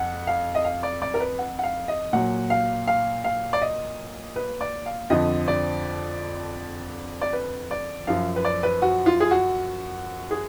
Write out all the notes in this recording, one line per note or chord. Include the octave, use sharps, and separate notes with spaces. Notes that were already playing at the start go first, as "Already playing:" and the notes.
Already playing: F2 F#5
F5
D#5
F5
D5
D5
A#4
B4
F#5
F#5
F5
D#5
A#2 F#3 F#5
F5
F5
F5
D5
D#5
B4
D5
F5
F2 D3 F3 D#5
D5
D5
B4
D5
F#2 F3 F5
B4
D5
B4
F#4
F4
G#4
F#4
G#4